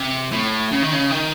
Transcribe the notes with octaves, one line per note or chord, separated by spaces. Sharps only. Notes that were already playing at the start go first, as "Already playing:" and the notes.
Already playing: C3
A2
C#3
D#3
C#3
D#3